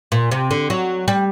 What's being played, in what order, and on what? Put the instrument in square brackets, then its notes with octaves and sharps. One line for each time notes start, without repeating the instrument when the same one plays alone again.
[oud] A#2
C3
D3
F#3
G3